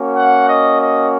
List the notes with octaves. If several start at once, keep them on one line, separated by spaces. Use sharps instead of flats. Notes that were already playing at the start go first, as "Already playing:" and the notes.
Already playing: A#3 C#4 F#4
F#5
D#5
D#5